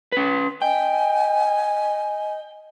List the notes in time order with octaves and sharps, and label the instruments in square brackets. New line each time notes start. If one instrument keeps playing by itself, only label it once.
[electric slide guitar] C#4 B4
[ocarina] D#5 [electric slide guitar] G5 [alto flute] G#5